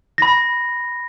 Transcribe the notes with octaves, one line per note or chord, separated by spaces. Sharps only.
B5 A#6